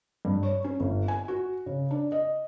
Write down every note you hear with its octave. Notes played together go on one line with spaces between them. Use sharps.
G2
C#5
C#4
G1
G#5
F#4
C#3
D4
D#5